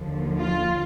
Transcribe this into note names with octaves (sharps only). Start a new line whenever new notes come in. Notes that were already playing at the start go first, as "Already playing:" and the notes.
Already playing: D#2 D3 F3
F4